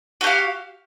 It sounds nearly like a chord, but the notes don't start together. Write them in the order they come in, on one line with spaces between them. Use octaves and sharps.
F#4 G4 F5